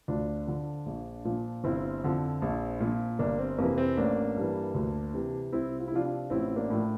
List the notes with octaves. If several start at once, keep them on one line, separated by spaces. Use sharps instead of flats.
D2 D4 F4
D3 F3
A#1
A#2 F3
G1 C4 E4
F2 D3 F3
A#1
A#2 F3
G1 A#3 D4
C4
F2 C3 E3 A#3
C4
A1 A#3 D4
G2 E3
D2
C3 E3
C2 C4 E4
F4
E4
C3 F3 D4 F4
D4 F4
A1 C4 E4
A#3 D4
A2 F3